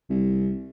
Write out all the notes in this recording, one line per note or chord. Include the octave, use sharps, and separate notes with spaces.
C2